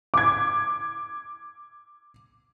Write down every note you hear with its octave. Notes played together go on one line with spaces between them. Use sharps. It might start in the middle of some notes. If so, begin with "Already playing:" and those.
D6 G#6